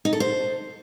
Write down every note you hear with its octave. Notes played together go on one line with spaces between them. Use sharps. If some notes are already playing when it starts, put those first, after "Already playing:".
D#4
A4
C5